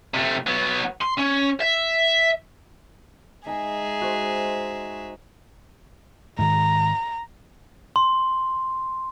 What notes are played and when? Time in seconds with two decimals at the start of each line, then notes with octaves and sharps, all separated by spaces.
0.14 C3 A3
0.47 F#3 B3
1.01 C6
1.18 C#4
1.60 E5
3.47 G#3 D#4 G#4 E5 G#5
4.01 F#4 C5
6.39 G#2 D#3 A#5
7.96 C6